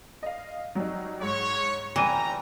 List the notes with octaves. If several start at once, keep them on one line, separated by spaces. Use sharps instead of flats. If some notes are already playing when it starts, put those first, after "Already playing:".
D#5 F5
F#3 G3 D#4
G#2 C#5
F1 E3 G3 G5 A#5 D#7